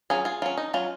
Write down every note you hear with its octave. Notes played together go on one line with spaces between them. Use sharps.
F#3 C#4 F4 G#4
F4 G#4
F#3 C#4 F4
D#4
F#3 C#4 F4